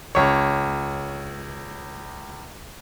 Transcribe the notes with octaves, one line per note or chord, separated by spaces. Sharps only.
C#2 C#5